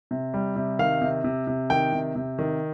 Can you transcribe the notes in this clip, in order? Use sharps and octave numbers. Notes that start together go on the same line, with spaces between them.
C3
G3
C3
D#3 F5
C3
C3
C3
D#3 G5
C3
C3
D#3